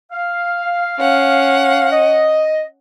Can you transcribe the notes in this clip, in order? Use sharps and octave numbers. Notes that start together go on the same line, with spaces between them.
F5
C#4 F#5
D#5